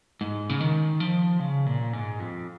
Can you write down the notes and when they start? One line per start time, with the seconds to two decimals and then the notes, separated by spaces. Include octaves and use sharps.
0.21 G#2
0.49 C#3
0.60 D#3
1.00 F3
1.40 C#3
1.66 A#2
1.93 G#2
2.20 F2